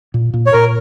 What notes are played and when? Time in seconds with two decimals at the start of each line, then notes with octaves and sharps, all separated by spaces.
0.14 A#2
0.34 A#2
0.46 C#5
0.53 A#2 A#4